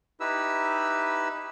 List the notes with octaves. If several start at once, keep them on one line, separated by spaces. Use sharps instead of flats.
D#4 E4 G4 B4 E6